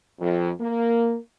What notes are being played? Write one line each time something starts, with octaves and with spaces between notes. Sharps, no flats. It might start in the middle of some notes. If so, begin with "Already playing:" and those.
F2
A#3